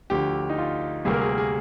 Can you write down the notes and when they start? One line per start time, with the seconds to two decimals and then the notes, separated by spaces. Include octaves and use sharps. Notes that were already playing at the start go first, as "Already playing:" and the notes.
0.10 D2 D3 F3 G4
0.49 D#4
0.58 F4
1.05 D2 C3 G3 A#3 G#4
1.13 A#4
1.21 G#4
1.29 A#4
1.38 G#4